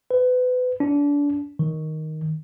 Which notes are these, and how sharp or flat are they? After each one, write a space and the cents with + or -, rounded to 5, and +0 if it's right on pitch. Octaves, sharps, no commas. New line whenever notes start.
B4 +30
D4 -30
D#3 +5